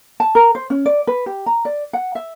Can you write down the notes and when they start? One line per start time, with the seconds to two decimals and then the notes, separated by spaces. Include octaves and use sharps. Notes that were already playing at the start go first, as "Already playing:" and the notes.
0.20 A5
0.35 A#4
0.55 C5
0.70 C#4
0.86 D5
1.07 B4
1.26 G4
1.46 A#5
1.65 D5
1.93 F#5
2.15 E5